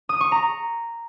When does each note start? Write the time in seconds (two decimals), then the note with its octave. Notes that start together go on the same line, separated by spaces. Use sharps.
0.09 D#6
0.21 C#6
0.32 A#5